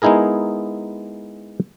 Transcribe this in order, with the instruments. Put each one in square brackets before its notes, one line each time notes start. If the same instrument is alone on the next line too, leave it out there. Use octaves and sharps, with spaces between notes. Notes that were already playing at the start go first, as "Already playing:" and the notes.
[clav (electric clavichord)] G#3 B3 D#4 E4 G#4 A#4